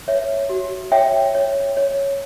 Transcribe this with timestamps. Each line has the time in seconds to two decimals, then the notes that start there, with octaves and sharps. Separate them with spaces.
0.08 B4 C#5 E5
0.49 F#4
0.92 C#5 E5 G5
1.35 C#5
1.77 C#5